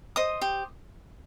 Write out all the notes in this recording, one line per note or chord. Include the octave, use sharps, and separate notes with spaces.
C5 D#5 D#6
G4